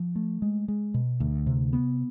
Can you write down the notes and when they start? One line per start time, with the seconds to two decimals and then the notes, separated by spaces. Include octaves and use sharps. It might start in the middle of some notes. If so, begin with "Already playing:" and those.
Already playing: F3
0.16 A3
0.42 G#3
0.68 G#3
0.94 B2
1.20 D2
1.47 C3
1.73 B3